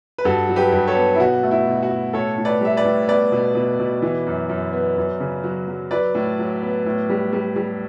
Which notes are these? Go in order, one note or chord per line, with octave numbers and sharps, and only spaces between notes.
B4
G2 F#4 A4
F#3
G4 B4
G2
A4 C#5
B3
E4
B2 F#4
A3
E4
B2
F#4
B2
A2 A4 C#5
A2
B4 D5
G3 E5
B4 D5
A2
B3 B4 D5
B2
B2
B2
E3
F#2
F#2
B3
F#2
C#3
F#3
F#3
F#3 B4 D5
A2
F#3
B3
A2
G3
G3
G3